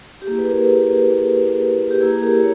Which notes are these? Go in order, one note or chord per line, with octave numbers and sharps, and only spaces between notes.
G4
A#3 E4 G#4
G#4 B4
G4 A#4
G#4
G#4
G4
A#3 E4 G#4
G4 A#4
C#5